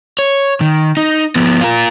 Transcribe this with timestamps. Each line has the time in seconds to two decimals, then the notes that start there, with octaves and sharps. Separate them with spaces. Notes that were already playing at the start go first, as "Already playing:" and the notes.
0.19 C#5
0.61 D#3
0.97 D#4
1.36 F3 B3
1.61 F4 A#4